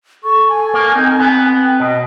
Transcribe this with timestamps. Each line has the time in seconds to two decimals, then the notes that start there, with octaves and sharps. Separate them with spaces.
0.24 A4 C#6
0.49 G#5
0.74 A#3
0.95 C4 D#4
1.20 B3
1.80 B2 D#5